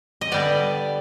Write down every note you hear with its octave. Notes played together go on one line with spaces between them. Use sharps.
D#5
D3 G3 B3 D5